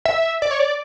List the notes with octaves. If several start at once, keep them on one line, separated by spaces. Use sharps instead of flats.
E5
D5
C#5
D5